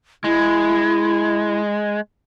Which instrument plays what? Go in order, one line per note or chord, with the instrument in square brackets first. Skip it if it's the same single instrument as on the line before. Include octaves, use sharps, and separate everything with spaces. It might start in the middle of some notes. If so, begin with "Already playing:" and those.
[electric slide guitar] G#3 [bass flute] E4